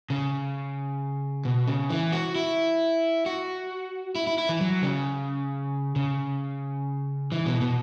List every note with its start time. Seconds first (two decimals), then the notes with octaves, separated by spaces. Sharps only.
0.10 C#3
1.45 B2
1.68 C#3
1.90 E3
2.13 F#4
2.35 E4
3.26 F#4
4.15 E4
4.27 E4
4.38 E4
4.49 E3
4.61 F#3
4.83 C#3
5.96 C#3
7.32 E3
7.46 B2
7.61 B2